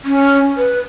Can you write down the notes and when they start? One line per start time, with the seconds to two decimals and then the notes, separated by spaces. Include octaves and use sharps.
0.05 C#4
0.57 B4